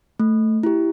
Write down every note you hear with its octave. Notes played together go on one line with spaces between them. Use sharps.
A3
E4 G4